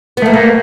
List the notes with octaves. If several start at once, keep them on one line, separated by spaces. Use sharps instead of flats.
B3
A3 A#3
A3 A#3